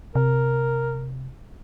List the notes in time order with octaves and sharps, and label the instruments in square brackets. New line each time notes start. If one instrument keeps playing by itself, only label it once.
[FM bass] C3 [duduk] A#4